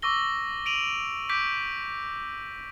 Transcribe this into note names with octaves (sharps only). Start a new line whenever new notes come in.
C#6 D6 E6 A#6 G7
D7 D#7 F7 F#7
D6 G6 B6 D7